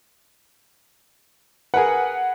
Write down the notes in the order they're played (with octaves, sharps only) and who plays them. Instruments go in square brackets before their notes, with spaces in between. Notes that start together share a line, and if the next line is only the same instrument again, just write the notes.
[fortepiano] G#4 A#4 B4 [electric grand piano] F#5 G#5